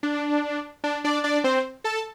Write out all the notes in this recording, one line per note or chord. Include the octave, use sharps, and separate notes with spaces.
D4
D4
D4 D5
D4 D5
C4 C5
A4 A5